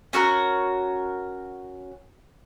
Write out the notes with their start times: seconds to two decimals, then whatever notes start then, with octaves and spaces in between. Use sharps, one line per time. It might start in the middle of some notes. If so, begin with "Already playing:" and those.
0.13 C#4 F#4 A4 A#4